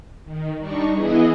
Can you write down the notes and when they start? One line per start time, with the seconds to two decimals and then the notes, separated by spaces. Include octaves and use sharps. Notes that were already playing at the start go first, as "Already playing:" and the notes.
0.25 D#3
0.59 G3 D4 D#4 C#6
0.93 E3 B3 E4 G#4 D#5